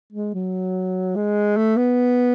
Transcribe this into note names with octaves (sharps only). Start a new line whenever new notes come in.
G#3
F#3
G#3
A3
B3